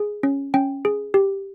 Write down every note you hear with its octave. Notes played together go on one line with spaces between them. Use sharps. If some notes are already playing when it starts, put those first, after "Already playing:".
Already playing: G#4
C#4
C#4 G5
G#4
G4